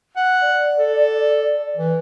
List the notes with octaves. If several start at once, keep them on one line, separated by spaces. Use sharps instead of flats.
F#5
D5
A4
E3